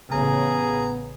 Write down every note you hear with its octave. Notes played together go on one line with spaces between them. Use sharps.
A1 C#3 B3 G#4 A#5